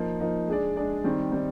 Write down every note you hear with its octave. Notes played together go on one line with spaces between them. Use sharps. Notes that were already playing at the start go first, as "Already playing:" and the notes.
Already playing: F3 A#3 D#4
F3 A#3 D#4
G#3 D4 G#4 D5
G#3 D4 G#4 D5
D#3 G3 C4
D#3 G3 C4